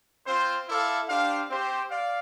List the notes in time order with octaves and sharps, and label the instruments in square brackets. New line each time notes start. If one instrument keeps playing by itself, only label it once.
[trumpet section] C4 F4 C5
E4 A4 D5 F5
D4 G4 C5 F5
C4 G4 C5
D5 F5